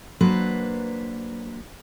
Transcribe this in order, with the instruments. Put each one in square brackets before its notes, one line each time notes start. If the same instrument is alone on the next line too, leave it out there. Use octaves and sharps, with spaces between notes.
[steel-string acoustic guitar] F#3 A#3 D4 B4 C5